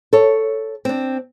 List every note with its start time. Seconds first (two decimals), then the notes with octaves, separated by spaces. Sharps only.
0.13 A4 C#5
0.85 C4 D4